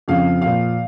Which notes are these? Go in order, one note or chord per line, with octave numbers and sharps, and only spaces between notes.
F2 C#3 F3 F5
A#2 F3 F5